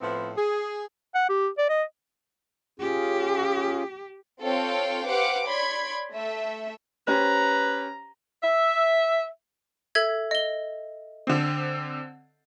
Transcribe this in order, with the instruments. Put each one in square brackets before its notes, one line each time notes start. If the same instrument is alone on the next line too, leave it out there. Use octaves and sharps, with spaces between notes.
[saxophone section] A2 F3 B3 C4 E4 B4
G#4
[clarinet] F#5
G4
D5
D#5
[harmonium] C#4 F4 G#4 [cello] G4
[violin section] C4 F4 A4 C#5 F5 G5
G4 B4 C5 F5 F#5 D6
C#5 D5 B5 C6 G#6
A3 E5
[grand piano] C#4 G4 C5 [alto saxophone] B4 [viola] A#5
[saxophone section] E5
[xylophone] A4 E5 G#6
D#5 G7
[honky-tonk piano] D3 C4